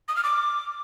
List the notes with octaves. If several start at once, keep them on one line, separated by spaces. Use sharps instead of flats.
D#6
F6
D6